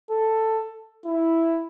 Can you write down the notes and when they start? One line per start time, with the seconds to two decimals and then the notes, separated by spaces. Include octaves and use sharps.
0.10 A4
1.05 E4